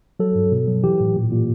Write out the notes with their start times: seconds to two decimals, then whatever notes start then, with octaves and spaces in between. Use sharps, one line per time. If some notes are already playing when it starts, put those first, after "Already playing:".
0.20 F#3 A4
0.35 G2
0.52 B2
0.68 F#3
0.84 E3 G4
1.00 A2
1.16 A#2
1.31 A#2